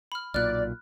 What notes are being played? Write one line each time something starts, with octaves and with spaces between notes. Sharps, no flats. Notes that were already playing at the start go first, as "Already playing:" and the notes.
B5 F6
B1 A#2 D5 F6 F#6